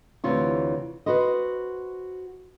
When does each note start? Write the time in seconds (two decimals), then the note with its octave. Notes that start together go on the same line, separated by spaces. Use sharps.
0.24 D2 C3 E3 F4 C#5
1.06 F#4 B4 C5 D#5